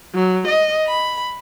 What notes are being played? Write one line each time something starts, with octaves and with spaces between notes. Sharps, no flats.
F#3
D#5
B5